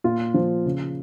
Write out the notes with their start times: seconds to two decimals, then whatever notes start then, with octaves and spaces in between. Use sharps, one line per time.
0.04 A#2 F4
0.34 F3
0.66 C#3